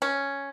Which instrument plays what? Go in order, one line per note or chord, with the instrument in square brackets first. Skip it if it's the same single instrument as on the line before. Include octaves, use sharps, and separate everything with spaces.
[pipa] C#4